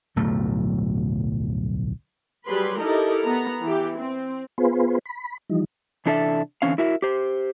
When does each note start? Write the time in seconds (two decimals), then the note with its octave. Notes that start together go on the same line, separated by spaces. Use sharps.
0.16 D1 B1 F2 A3
2.46 F#3 G3 G#4 B4 B5 C6
2.79 D#4 E4 G4 A4 A#4 D#5
3.22 B3 A#5
3.62 E3 G4
3.97 C4
4.58 B3 F4 G#4 B4 C5
5.06 B5
5.50 E3 F3 G3 D#4
6.06 C3 E3 D4 A4 A#4 E5
6.62 D3 E3 C4 C#4 F5
6.78 E4 F#4 A#4 E5
7.02 G4 C5